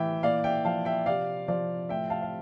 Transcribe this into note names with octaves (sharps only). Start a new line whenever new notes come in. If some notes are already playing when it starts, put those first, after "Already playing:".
Already playing: A2 E3 E5 G5
A#2 D5 F5
E5 G5
F3 F5 A5
E5 G5
C3 D5 F5
F3 D5 F5
A2 E5 G5
F5 A5
F5